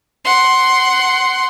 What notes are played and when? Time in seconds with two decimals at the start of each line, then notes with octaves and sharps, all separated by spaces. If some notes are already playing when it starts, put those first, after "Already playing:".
0.25 F#5 C6